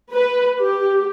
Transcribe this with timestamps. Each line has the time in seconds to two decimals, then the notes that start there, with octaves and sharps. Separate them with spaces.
0.12 B4
0.60 G4